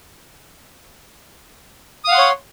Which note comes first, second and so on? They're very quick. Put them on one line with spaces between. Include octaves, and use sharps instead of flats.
D#6 F5 F#5 C6 C#5